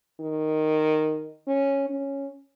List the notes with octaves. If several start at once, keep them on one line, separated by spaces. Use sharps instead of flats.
D#3
C#4
C#4